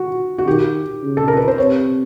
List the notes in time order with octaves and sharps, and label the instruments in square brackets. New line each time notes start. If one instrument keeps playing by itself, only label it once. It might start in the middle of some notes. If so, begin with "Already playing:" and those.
Already playing: [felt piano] F#4
F#4
[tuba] D#3 [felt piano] G4
[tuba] C#3
[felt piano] A4
A#4
B4
C5
[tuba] C3 [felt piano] C#5